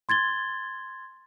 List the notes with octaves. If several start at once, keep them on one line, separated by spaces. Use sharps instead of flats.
C6 G#6 A6 G7